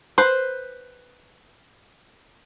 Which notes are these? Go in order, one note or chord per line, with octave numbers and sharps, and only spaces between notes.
B4 C5